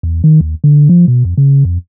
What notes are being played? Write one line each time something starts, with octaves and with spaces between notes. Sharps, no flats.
E2
D#3
D#2
D3
F3
B2
F2
C#3
F2